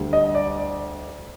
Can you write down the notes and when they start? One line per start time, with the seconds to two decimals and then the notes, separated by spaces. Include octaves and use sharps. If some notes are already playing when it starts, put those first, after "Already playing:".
Already playing: D2 D3 G3
0.13 D#5
0.35 D5